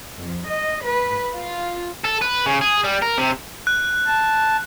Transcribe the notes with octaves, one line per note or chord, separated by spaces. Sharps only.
F2
D#5
B4
F4
A4
B4
C#3
G#4
G3
A#4
C3
F#6
A5